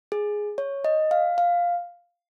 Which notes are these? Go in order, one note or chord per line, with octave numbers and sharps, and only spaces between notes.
G#4
C#5
D#5
F5
F5